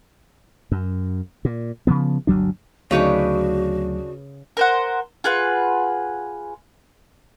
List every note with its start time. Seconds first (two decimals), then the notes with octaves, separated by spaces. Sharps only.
0.72 F#2
1.45 A#2
1.87 C#3 F3 B3
2.27 G1 D2 F#3 D4
2.91 D2 C#3 F#3 D4 D#4 F#4 B4 C#5
4.57 A#4 C5 F#5
5.24 F4 G#4 B4 F#5